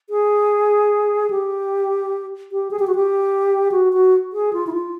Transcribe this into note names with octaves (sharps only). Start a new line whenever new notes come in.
G#4
G4
G4
G#4
G4
F#4
G4
F#4
F#4
G#4
F4
E4
F4